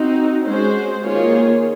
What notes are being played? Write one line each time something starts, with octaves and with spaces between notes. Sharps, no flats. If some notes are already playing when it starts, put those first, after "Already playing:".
Already playing: C4 D#4 F#4
G#3 C#4 F#4 C5
D#3 A#3 F4 G#4 C#5